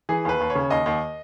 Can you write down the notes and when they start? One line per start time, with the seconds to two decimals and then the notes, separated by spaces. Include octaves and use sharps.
0.09 E3 G#4
0.25 D#2 B4
0.40 D#2
0.50 C#5
0.55 C#3
0.70 D#2 D#5
0.86 D#2